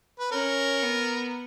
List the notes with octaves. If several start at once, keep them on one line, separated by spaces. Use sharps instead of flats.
B4
C#4 A#4
B3